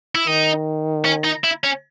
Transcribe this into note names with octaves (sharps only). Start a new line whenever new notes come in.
E4
D#3 D#4
C#4
D#4
E4
C#4